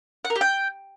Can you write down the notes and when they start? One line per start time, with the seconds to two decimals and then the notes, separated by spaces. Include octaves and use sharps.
0.25 F#5
0.30 A#4
0.36 G4
0.41 G5